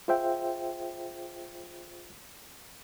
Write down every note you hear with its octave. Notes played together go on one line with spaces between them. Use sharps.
F4 G#4 C5 E5 G5